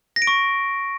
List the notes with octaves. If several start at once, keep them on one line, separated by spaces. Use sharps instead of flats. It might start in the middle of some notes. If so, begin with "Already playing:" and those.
A#6
D7
C#6